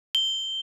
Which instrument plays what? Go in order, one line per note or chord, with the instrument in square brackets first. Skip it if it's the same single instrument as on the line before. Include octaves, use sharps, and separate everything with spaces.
[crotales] G7